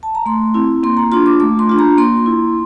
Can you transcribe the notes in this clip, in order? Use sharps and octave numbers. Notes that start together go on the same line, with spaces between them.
A5
A#5
A3 C6
C4 E4
A#3 C6
A#5
D4 F4 C6
D6
A3 D6
C6
D4 F4
A#5
A#3 C6
E4